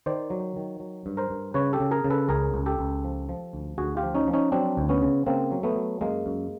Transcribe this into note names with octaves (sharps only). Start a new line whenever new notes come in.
D#3 C5 D5
F#3
D#3
F#3
G2
A#4 C5
G2
C#3 B4 C#5
G4 A4
C#3
G#4 A#4
C#3
A4 B4
C#2 G#4 A#4
C#2
G4 A4
C#2
F3
F3
D2
D2 F#4 G#4
F4 G4
F3
C#4 D#4
F3
C#4 D#4
F#3 C4 D4
D2
B3 C#4
C#3
C#3 A#3 C4
F#3
A3 B3
F#3
F#2 G#3 A#3
F#2